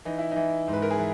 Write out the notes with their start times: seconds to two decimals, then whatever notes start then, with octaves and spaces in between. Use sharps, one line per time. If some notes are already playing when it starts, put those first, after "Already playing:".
0.05 E3 D#4
0.18 E4
0.31 E3 D#4
0.68 G#2
0.73 B4
0.82 A#4
0.91 G#4
0.98 E3